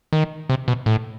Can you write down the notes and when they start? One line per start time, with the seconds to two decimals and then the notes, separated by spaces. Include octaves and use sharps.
0.13 D#3
0.50 C3
0.68 B2
0.86 A2